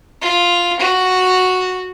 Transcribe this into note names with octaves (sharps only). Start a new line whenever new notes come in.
F4
F#4